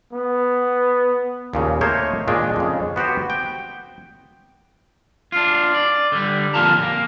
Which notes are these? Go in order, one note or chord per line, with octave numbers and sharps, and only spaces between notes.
B3
D#2 A#2 C#3
A3 A#3 D#4 C5 C#5
A#2 D#3 G#3 D4
F2 C#3
B3 F#4 G4 C5
G5
D4 F4
D5
D3 G3
F2 A#2 D3 F4 A5 A#5
A#3